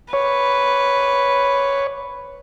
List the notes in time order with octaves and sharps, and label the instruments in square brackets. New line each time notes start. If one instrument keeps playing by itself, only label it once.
[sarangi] B4 [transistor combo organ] C#5